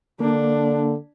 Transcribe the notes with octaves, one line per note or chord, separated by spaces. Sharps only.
D3 A#3 D4